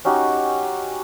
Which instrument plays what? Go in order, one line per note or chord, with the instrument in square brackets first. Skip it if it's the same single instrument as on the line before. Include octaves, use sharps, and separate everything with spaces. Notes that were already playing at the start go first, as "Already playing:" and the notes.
[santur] C#4 D#4 F#4 G4